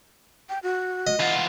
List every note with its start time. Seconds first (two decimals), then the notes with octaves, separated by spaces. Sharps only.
0.49 G5
0.63 F#4
1.07 D#5
1.20 E2 F4 F#5